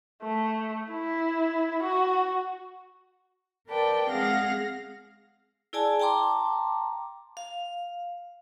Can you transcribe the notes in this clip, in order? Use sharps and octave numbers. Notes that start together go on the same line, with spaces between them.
A3
E4
F#4
A#4 B4 D5 G5 A5
G#3 C4 G#4 F5 F#5 A#6
E4 G#4 D5 G#5 A5
G5 A5 A#5 C6 D6
F5